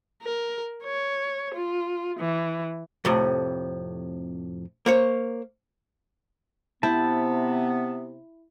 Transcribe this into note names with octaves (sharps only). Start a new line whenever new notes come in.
A#4
C#5
F4
E3
F2 A2 C3
A#3 C5 C#5
C3 B3 E4 G5 A5